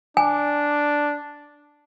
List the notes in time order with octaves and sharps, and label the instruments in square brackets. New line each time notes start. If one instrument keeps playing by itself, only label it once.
[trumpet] D4 [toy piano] G#5